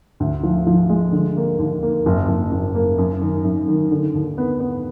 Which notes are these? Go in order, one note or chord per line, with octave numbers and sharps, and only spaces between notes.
D2
F3
F3
G#3
D3
A#3
D#2
A#3
F#1
F#1
F#1
A#3
F#2
D#3
F#2
D#3
D3
D#2
B3
B3